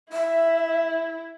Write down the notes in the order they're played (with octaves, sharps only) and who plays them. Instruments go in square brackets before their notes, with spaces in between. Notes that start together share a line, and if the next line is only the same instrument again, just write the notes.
[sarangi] E4 [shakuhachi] E5